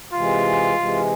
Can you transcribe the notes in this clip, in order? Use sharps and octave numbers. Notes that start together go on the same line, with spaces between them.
C3 E3 G#3 F4
C3 E3 G#3